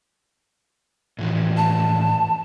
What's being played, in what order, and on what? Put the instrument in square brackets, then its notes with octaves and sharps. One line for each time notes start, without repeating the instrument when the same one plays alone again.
[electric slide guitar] A2 E3 F3
[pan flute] A5